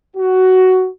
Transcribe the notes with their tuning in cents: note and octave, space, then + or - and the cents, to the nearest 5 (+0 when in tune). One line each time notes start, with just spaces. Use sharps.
F#4 +10